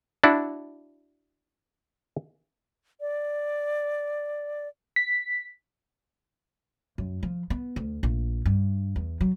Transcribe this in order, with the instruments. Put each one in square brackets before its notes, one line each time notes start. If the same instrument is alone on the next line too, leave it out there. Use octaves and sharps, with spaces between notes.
[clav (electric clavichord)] D4 E4 F#4
[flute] D5
[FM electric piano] B6
[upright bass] F#2
F3
B3
D2
A#1
G2
E2
F#3